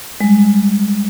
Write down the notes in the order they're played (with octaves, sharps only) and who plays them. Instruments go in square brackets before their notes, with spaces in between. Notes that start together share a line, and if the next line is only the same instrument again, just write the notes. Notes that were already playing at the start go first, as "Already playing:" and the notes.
[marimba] G3 G#3